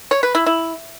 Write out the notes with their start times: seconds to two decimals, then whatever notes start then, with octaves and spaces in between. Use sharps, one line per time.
0.11 C#5
0.23 B4
0.35 E4
0.46 E4